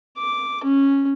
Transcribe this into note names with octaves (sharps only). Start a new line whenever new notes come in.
D6
C#4